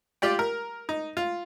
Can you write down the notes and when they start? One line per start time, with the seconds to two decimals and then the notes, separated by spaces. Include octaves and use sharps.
0.22 F4 G4 D5 G5
0.39 A#4
0.89 D#4
1.17 F4